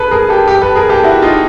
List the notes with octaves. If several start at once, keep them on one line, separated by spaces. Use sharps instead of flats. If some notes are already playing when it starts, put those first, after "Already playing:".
Already playing: G#4 A4 B4
G#4 A#4
G4 A4
G4 A4
A4 B4
G#4 A#4
G4 A4
E4 F#4
D#4 F4